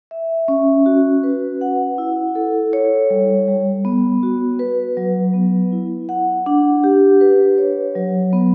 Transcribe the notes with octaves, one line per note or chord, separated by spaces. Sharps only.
E5
C#4
F#4
B4
F#5
E4
A4
C#5
G3
G3
B3
F#4
B4
F#3
B3
E4
F#5
D4
G4
B4
C#5
F#3
B3